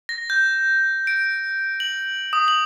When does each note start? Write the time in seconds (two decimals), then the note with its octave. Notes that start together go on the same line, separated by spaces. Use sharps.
0.09 A#6
0.30 G6
1.07 D7
1.80 F#7
2.33 D#6
2.48 F#7